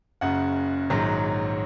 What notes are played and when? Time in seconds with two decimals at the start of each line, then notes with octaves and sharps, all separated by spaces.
0.21 F#1 F#2 C#3 F#5
0.90 A#1 G#2 D#3 F#3